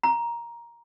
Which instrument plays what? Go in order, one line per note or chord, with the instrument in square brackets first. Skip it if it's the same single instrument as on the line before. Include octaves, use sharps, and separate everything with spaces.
[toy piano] A#5